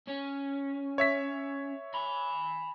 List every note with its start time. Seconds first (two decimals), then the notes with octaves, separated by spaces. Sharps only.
0.08 C#4
0.98 C#5 E5 B6
1.94 G#5 B5